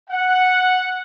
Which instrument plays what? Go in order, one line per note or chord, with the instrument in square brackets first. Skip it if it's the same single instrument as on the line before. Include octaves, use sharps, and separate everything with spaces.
[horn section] F#5